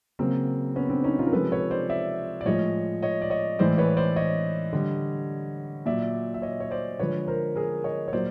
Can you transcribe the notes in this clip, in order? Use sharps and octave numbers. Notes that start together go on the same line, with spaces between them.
C#3 F#3 A#3 C4
B3 C#4
C4 D4
C#4 D#4
D#4 F4
A#4
C3 F3 G#3 A4 B4
B4 C#5
C5 D5
D5 E5
D5
A2 F3 G#3 C#5 D#5
C#5 D#5
D5
C#5 D#5
A2 E3 G#3 C5 D5
B4 C#5
C5 D5
C#5 D#5
D3 G3
A#2 F#3 D5 E5
E5
C#5 D#5
C#5
C5 D5
D3 F3 G#3 B4 C#5
A#4 C5
G#4 A#4
C#5 D#5
C#5
A#2 F#3 C5 D5